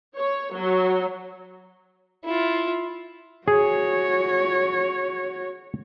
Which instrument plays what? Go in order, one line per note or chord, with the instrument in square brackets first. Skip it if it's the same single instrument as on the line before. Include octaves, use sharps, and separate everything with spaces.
[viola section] C#5
F#3
[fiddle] E4 F4
[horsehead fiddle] F#4 C#5 [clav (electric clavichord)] G#4